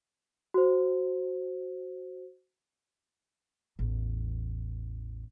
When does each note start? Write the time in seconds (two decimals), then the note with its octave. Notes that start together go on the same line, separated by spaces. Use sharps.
0.54 F#4 C5
3.79 A1 E2